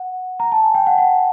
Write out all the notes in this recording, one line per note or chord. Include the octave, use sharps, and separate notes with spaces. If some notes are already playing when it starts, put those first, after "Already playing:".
Already playing: F#5
A#5
A5
G#5
G5
F#5
F#5